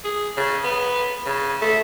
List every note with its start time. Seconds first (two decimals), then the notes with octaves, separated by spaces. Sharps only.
0.04 G#4
0.37 C#3
0.64 B3
1.26 C#3
1.62 A3